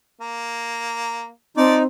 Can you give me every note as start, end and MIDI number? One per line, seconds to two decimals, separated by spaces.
0.21 1.29 58
1.57 1.75 53
1.57 1.86 60
1.57 1.83 63
1.57 1.75 74